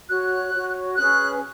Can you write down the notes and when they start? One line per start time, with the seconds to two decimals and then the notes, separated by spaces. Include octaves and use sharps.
0.09 F#4 C#5 F#6
0.54 F#4 C#5
0.97 C#4 G#4 B4 F#6